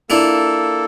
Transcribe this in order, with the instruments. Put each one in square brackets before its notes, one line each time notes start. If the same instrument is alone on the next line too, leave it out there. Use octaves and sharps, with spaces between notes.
[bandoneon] A#3 A4 [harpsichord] D4 E4 F4